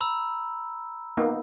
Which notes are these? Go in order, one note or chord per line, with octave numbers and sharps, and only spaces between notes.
A#5 B5 E6
A#3 B3 D#4